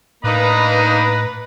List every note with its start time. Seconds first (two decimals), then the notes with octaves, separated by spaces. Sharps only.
0.24 A2 A#3 D4 D#4 B4 A#5